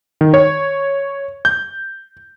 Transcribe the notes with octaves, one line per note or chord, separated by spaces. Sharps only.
D#3
C#5
G6